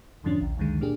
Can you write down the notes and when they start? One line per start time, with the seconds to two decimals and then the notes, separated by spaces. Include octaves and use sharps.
0.24 F2 G#2 D3 F3 C#4 D4
0.41 A#1 D#2
0.57 C#2 F#2 D3 D#3 G#3
0.81 A#2 A#3 D4 G4 G#4